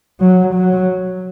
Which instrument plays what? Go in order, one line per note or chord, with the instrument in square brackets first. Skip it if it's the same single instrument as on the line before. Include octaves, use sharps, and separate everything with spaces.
[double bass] F#3
F#3